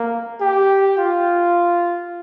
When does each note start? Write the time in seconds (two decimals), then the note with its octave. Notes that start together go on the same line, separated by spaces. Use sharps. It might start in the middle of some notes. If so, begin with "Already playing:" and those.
Already playing: A#3
0.41 G4
0.98 F4